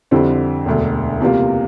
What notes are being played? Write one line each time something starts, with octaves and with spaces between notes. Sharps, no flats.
F2 D3 G3 C4 E4
E1 D2 D3
E2 C3 G3 A#3 F4